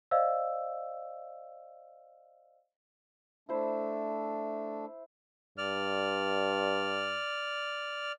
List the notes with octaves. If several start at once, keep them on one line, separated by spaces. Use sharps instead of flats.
C5 D5 D#5 F5 E6
A3 D4 E4 C5 E5
G2 D5 F6